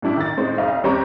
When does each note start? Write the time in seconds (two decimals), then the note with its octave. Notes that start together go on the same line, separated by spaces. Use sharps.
0.02 A2 G3 D4 E4 G4
0.17 D#3 A6
0.37 A2 G#3 C4 D#4
0.58 F#1 C2 D#5 F5
0.84 D#2 G3 C4 G4 C#5 A#5